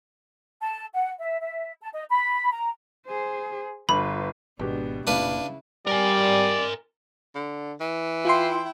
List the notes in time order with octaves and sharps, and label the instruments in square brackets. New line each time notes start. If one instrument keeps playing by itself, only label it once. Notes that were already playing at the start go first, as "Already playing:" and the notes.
[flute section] A5
F#5
E5
E5
A5
D#5
B5
A#5
[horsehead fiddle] G#4 C5
[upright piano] G1 [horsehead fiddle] F4 B4 [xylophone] B5
[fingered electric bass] G#1 [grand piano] B2 G#3 G4 [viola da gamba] B3 D4
[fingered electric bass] F1 A#2 [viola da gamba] C#3 E4 [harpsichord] D4 B4 F5
[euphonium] G3 [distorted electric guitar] A#4 G#5 [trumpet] D5
[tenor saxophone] D3
E3
[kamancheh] E4 G5 [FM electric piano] F4 C6